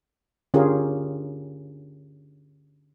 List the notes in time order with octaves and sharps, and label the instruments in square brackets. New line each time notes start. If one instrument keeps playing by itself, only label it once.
[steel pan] D3 C#4 F4 G4 G#4 A#4